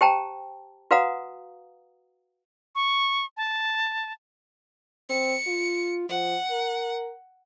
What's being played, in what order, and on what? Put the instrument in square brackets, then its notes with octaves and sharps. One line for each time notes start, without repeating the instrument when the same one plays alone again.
[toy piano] G4 C5 G5 A5 A#5
F#4 B4 F5 F#5 A#5 D#6
[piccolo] C#6
A5
[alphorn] C4 [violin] C#7
[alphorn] F4
[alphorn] F3 [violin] F#5
[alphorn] A#4